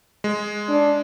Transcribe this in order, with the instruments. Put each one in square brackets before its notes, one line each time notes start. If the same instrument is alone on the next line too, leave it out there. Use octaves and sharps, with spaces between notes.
[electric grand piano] G#3
[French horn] D4